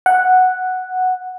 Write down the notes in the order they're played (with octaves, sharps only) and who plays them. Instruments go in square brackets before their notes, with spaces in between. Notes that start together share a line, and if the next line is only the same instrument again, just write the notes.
[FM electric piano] F#5